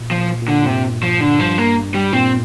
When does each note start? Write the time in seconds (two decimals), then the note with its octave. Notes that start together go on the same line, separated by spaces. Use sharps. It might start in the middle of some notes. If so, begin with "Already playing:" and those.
Already playing: A#2
0.11 F3
0.17 A#2
0.42 A#2
0.48 D3
0.62 A#2
0.66 G2 C3
1.03 F3
1.20 D3
1.39 G2 F3
1.58 A#3
1.94 G3
2.12 A#2 C4